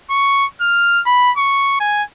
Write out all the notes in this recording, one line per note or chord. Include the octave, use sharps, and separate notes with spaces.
C#6
F6
B5
C#6
G#5